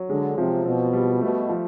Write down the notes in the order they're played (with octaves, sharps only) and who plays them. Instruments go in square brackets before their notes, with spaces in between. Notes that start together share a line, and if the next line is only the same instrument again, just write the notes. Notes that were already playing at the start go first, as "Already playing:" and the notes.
Already playing: [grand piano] F#3
[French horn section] D3 [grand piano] G#3
[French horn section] C3 [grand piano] F3
[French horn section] B2 [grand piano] C4
[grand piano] G3
[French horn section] B2 [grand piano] A3
[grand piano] F3